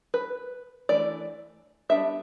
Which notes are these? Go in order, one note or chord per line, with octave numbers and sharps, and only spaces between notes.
B4
E3 A3 D4 D5
G3 B3 D4 E5